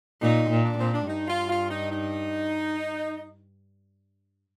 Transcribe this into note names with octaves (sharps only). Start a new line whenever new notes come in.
A#2 D#4
A#2
D4
A#2 C4
D4
G2 D#4
F4
F4
D#4
D#4